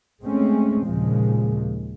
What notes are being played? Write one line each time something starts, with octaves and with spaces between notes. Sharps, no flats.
G#3 A3 C4 C#4
D#2 A#2 C#3 F3 G#3